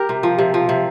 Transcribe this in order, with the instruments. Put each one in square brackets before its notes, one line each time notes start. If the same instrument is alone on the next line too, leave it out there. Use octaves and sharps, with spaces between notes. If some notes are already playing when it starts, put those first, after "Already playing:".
Already playing: [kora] G4 A#4
C3
F3
C3
F3
C3